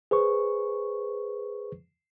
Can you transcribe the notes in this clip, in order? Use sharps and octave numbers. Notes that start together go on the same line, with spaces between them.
G#4 B4 C5 C#6